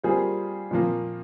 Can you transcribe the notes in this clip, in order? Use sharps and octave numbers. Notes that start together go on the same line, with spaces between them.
G3 A#3 F4 G#4 C5
A#2 F3 A#3